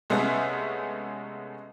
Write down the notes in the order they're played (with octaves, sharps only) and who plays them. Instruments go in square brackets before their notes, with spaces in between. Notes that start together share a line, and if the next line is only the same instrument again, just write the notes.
[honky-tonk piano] C2 G#3 A3 B3 C#4 E5